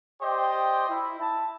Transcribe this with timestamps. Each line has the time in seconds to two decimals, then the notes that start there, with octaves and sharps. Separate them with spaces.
0.21 G4 C5 D5 D#5 G5
0.89 E4
1.20 E4 A5